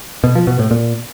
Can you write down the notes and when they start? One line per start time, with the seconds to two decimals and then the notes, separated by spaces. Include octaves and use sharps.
0.24 B2
0.35 F3
0.47 B2
0.59 A2
0.71 A#2